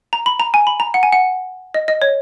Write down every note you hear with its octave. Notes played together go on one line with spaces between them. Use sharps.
A#5
B5
A#5
G#5
B5
A#5
F#5
G#5
F#5
D#5
D#5
C#5